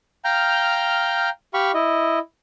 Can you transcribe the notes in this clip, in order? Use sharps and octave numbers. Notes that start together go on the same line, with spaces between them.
F5 G5 A#5 F6 G6
G4 F5 B5 C#6
E4 D#5